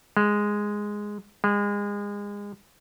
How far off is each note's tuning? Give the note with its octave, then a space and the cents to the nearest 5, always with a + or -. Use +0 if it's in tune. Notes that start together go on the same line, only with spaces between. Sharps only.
G#3 -5
G#3 -30